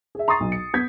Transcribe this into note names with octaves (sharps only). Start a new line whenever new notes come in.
G#4 E5
A#5 C6 C#6 D#6 A6 C7
B1
C#7
B3 G6 G#6 B6